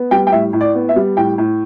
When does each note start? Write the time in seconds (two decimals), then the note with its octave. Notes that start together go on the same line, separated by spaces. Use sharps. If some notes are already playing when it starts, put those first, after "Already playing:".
Already playing: B3
0.11 G3 G5
0.27 G5
0.32 A2 E5
0.53 A2
0.61 D5
0.75 B3
0.89 E5
0.96 G3
1.17 A2 G5
1.38 A2